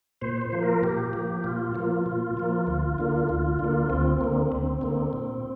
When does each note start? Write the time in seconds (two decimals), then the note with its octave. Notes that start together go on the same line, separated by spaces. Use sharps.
0.21 A#2 C5
0.41 C5
0.52 F3 A#3
0.63 A#4
0.83 A#2 G4
1.13 F3 A#3
1.44 A#2 F4
1.75 F3 A#3
2.06 A#2
2.37 F3 A#3
2.67 D2
2.98 D3 A#3
3.29 D2
3.59 D3
3.64 A#3
3.90 D2 C4
4.21 D3 A#3
4.52 D2
4.81 D3 A#3
5.13 A#2